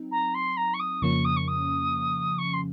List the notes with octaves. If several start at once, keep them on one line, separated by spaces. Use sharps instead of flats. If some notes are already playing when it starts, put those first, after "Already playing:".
Already playing: F#3 C4 D#4
A#5
C6
A#5
C#6
D#6
F2 C#3 F3 A#3 C#4 C#6
D#6
C#6
D#6
C#6
C6